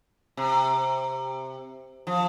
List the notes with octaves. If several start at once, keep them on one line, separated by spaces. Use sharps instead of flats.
C3
F3